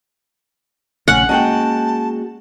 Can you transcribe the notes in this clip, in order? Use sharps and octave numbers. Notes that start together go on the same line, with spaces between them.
A#1 C#3 A3 C#4 F#5
G#3 A#3 C#4 F#4 G5 A5